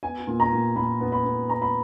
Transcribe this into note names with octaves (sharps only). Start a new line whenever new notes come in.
B3 G#5
A#2
A#5
A#2
A#2 B5
B3
B5
B3
B3 A#5
B5